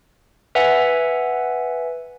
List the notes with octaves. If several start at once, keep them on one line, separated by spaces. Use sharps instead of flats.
B4 E5 F#5 G#5